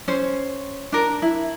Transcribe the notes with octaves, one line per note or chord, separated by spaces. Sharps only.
C#4 C5
D4 A#4
E4